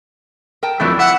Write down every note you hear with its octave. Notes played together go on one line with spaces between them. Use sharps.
A#4 G5 A5
F2 E3 F#3 A3 E4 D5
E5 F#5